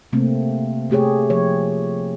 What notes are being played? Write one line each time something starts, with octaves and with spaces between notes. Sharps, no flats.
C3 A3 A#3 C4
C3 A3 G4 G#4 C#5
F3 C#5